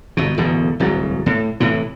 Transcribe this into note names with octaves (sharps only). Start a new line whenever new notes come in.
G1 B2
D1 E2 G#2 B2
D1 C2 G#2 F#3
A2
A2 C3 E3